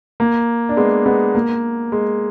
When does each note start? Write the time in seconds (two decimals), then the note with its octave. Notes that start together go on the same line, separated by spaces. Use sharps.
0.20 A#3
0.69 D4
0.77 G#3 B3
1.06 G#3 B3
1.35 A#3
1.92 G#3